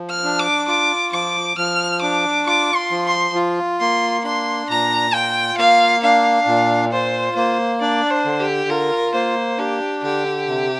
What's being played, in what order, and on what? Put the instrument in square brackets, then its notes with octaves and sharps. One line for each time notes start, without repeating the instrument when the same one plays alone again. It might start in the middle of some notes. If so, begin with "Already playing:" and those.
Already playing: [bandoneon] F3
[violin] F6
[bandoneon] D4
[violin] D6
[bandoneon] F4 [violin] D6
[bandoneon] F3 [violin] D6
[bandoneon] F3 [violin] F6
[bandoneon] D4 [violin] D6
[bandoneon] F4 [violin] D6
[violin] C6
[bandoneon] F3
[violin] C6
[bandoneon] F4
[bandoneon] A#3 [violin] C6
[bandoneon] D4 [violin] C6
[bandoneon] A#2 [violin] A#5
[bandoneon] F4 [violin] G5
[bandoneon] A#3 [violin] F5
[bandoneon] D4 [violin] F5
[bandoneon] A#2
[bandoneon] F4 [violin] C5
[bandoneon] A#3 [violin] C5
[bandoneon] D4 [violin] D5
[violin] C5
[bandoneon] D3
[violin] G4
[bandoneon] F4 [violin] A#4
[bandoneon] A#3 [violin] C5
[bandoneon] D4 [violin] G4
[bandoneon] D3 [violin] G4
[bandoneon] C3